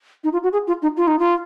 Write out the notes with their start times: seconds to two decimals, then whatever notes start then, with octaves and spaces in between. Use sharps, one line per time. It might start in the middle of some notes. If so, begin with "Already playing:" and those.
0.24 D#4
0.33 F4
0.43 F#4
0.53 G#4
0.67 F4
0.82 D#4
0.97 F4
1.07 D#4
1.19 F4